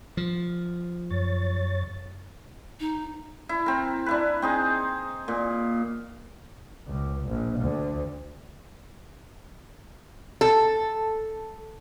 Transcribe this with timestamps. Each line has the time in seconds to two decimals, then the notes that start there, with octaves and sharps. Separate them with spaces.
0.17 F3
1.11 F#2 C#5 A6
2.80 D#4
3.49 E4
3.66 C4 A#4
4.06 D4 E4 B4
4.42 C4 D#4 G#4
5.28 A#2
6.88 C#2
7.29 A#1
7.59 D2
10.41 A4